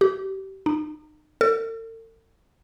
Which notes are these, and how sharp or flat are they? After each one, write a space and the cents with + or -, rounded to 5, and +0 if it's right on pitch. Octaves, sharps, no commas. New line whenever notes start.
G4 -30
D#4 -35
A4 +45